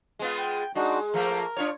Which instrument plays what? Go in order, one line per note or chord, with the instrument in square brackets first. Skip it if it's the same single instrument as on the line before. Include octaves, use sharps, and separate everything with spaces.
[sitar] G#3 B3 F4
[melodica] G5
[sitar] G#3 [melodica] D4 D#4 F#4
[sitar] F3 A3 A#3 [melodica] A#4
[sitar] D4 F4 C#5